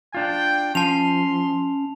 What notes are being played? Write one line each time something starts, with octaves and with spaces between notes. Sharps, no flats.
D4 F4 G5
F3 C#4 A5 C6 F7